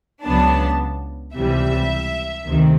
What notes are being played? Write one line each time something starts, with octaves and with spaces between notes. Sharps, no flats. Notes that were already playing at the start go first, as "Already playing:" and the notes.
C#2 C#3 F#3 B3 D4 A5
C#2 C3 E3 G3 E5
D2 C3 D#3